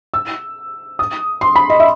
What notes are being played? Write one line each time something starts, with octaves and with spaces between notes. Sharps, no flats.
E6
D#6
C6
B5
D#5
E5